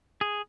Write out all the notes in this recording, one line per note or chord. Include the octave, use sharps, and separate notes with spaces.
G#4